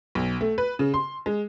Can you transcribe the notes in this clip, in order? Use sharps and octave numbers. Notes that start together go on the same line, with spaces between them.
B1
A3
B4
C#3
C6
G#3